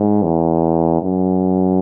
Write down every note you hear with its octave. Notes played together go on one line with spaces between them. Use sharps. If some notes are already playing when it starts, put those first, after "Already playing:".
Already playing: G#2
E2
F#2